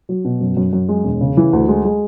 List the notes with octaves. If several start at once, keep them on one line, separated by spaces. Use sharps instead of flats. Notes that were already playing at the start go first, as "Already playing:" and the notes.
F#3
B2
F#2
F#2
F#2
G#3
E1
C#3
E3
D2
G#3
G#3